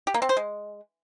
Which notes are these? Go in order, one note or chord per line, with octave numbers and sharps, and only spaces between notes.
G4
A#3
C4
C5
G#3